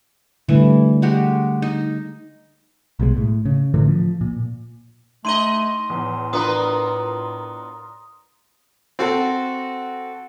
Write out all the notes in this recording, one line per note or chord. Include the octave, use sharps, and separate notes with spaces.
D3 E3 G3 A3
G#3 F#4 G4
D#4
B1 B2 G#3
A2
C#3
A2 D3 E3 A3
F3
A#2
A3 D#4 D#5 C6 D#7 G7
E2 A2
B3 D4 F4 A#4 B4 C6 D#6
C4 F#4 A4